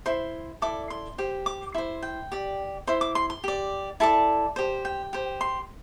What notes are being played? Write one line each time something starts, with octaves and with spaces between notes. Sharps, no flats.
E4 C5 C6
E4 A4 D5 D6
C6
G4 C5
D6
E4 C5 C6
G5
G4 D5
E4 C5 C6
D6
C6
C6
G4 D5
E4 A4 D5 A5
G4 C5
G5
G4 C5
C6